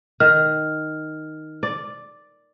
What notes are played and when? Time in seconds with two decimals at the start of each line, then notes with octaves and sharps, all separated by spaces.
0.20 D#3 F6
1.63 D5